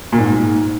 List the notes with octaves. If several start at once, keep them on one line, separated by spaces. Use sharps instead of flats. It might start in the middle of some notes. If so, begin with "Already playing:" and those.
A#2
G#2